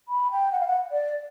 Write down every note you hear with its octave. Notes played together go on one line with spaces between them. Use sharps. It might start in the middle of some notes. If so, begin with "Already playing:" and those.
B5
G5
F#5
F5
F#5
D5